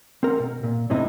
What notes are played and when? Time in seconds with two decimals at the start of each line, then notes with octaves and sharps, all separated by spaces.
0.23 C4 A#4 F#5 A#5
0.40 B2
0.63 A#2
0.90 F#2 A2 C3 C4 D#4 E4